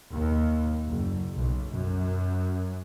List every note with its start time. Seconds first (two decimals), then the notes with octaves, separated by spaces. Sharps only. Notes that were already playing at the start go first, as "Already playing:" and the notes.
0.13 D#2
0.88 F#1
1.35 B1
1.74 F#2